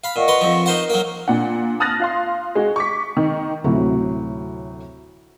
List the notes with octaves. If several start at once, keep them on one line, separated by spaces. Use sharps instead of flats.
F5 B5
A#2 D#5 F#5 C#6
B4 A#5 C6
F2 F3
D#4 A#4 C5 F#5
F#3 A#3
A#2 D4 F#5
A5 D#6 F6 F#6 A6 A#6
F4 F5 C6
G#3 F#4
C#6 D6 B6
D#3
D2 A2 C3 F#3